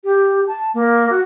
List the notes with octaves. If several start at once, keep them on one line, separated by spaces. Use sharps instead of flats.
G4
A5
A#3
F#4